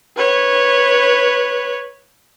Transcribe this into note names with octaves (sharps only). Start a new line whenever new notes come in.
B4 C#5